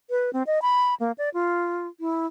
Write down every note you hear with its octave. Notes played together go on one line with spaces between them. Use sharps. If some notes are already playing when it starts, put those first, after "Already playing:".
B4
C4
D#5
B5
A#3
D5
F4
E4